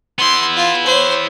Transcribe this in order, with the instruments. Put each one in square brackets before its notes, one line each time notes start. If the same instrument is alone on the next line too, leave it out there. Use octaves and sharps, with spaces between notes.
[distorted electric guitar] B3 E4 [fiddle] C6
[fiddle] F4
C5 C#5